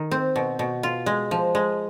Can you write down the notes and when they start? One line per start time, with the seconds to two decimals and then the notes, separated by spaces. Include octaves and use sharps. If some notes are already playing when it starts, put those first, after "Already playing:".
Already playing: D#3
0.11 C4
0.36 B2
0.59 B2
0.83 F4
1.06 G#3
1.31 F3
1.55 G#3